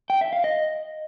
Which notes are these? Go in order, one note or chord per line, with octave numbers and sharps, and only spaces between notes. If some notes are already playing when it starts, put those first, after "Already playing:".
G5
E5
F5
D#5